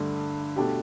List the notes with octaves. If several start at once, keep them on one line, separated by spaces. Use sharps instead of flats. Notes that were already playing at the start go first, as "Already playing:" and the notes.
Already playing: G2 D3 A3
B2 A3 D4 G4